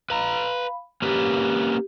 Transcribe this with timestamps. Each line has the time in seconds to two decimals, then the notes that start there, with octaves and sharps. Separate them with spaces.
0.10 B4 F5 A#5 B5
1.02 A#3 C#4 G4 B4